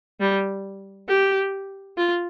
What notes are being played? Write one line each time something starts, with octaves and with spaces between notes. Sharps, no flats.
G3
G4
F4